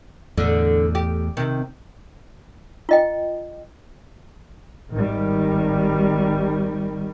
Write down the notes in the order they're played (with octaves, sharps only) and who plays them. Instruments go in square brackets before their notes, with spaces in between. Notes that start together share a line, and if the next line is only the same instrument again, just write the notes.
[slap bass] E2 A2 [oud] D3
[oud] G4
C3 D#3
[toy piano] F4 D#5 G5
[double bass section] G#1 D#3 G3